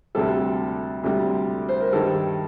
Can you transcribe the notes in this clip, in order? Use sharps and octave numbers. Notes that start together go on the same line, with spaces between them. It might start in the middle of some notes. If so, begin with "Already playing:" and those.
D2 C3 G3 A4
D2 C3 G3
C5
A#4
G2 D#3 G3 A4